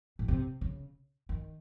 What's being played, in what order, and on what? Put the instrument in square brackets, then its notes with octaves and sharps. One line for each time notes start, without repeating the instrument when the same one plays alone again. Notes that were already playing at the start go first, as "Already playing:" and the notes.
[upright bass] A2
C3
C#3
D#3